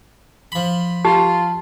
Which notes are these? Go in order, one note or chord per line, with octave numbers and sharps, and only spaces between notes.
F3 B5
F4 G4 A5